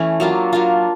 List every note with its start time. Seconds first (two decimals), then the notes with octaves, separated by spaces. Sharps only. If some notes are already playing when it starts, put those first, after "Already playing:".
Already playing: E3 A3 C#4
0.20 F#3 A#3 D4 F4
0.53 F#3 A#3 D4 F4